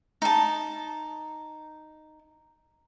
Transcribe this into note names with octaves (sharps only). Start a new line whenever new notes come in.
D#4 A5